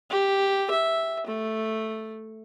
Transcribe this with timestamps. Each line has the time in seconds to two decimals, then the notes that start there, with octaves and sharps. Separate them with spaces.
0.10 G4
0.70 E5
1.27 A3